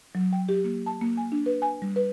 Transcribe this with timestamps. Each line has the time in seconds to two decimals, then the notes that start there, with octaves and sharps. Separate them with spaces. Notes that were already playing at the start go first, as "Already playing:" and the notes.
0.15 F#3
0.33 G5
0.49 G4
0.65 A#3
0.86 A5
1.01 A#3
1.17 G#5
1.32 D4
1.46 B4
1.62 G#5
1.82 G3
1.96 B4